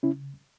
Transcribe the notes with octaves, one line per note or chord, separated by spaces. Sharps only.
C#3 C#4 E4